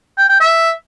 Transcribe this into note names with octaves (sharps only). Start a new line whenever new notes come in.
G5
G5
E5